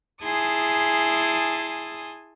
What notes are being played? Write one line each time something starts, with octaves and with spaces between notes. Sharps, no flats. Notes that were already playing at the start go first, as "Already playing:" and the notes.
E4 G#4 G#5 A5 C6 D#6